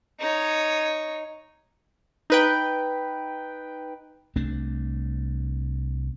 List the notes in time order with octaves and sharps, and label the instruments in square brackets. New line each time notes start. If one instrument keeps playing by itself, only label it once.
[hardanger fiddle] D#4 C#5
[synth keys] D#4 B4 G5
[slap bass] C2 A3 C4 D4